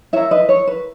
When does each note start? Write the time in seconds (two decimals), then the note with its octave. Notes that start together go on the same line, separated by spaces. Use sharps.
0.13 E4 A#4 C#5 E5
0.31 B4 D#5
0.49 C#5
0.67 B4